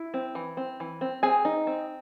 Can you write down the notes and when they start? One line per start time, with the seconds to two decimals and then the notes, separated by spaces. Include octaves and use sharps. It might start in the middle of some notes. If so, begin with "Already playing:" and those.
Already playing: E4
0.14 C4
0.35 E3
0.57 C4
0.80 E3
1.01 C4
1.23 C4 G#4 G#5
1.45 D#4
1.67 C4